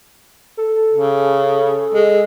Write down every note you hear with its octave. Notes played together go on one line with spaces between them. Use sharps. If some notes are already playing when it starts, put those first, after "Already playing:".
A4
C#3
G#3